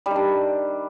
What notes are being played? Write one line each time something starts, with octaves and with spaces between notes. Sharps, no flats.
D#3 G3 D4